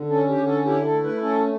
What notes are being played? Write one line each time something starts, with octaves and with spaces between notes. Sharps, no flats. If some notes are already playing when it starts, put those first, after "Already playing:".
Already playing: D3
C#4 A4
G4
D3
A4
E4 G4
A4
A3
B4
C#4 A4